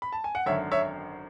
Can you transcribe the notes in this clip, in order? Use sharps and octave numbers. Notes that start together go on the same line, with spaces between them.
B5
A5
G#5
F#5
G#1 F#2 D3 C#5 E5
C#5 E5